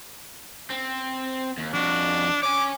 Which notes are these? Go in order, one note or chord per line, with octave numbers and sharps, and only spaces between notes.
C4
D#2
F2 D4 F#4
C#5 G#5 D6